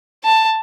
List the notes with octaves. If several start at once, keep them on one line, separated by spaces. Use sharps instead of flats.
A5